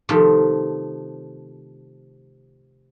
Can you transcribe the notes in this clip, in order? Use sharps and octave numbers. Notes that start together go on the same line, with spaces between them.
C3 D#3 F3 A3